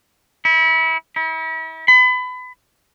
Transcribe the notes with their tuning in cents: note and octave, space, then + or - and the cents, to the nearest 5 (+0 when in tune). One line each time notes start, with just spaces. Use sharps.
E4 -30
E4 -40
B5 +30